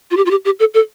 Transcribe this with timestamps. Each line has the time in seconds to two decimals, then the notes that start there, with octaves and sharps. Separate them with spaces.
0.11 F4
0.17 G4
0.26 F4
0.31 G4
0.45 G4
0.60 A4
0.74 A4